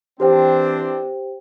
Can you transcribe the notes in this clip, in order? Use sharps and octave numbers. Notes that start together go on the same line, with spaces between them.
E3 C4 D4 G4 C5 G5